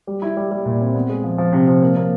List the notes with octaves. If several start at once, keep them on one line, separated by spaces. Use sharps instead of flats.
G3
E4
G3
G3
A#2
C4
B3
G#3
F3
F3
C3
F3
A#3
A#3